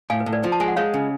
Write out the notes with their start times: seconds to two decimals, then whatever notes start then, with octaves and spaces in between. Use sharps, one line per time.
0.10 A2 F5 G#5
0.20 B4
0.26 A2
0.32 B4 D5
0.44 F3
0.52 A5
0.60 G#3 G#5
0.68 F#5
0.76 G#3 C#5 F5
0.94 C#3